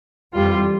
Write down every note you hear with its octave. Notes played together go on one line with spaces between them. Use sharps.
F2 E3 G3 F4